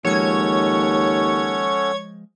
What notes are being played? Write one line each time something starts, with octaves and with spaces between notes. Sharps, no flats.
D#2 F3 G#3 C#4 A4 C#5 F#5 G#6